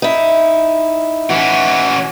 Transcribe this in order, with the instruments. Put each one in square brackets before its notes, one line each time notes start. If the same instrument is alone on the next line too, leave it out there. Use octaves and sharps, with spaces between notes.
[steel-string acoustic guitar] D#4 E4
[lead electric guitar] E3 C#4 [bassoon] F#4